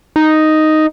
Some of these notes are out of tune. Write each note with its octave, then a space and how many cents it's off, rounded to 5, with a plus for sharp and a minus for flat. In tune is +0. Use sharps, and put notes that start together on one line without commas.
D#4 +0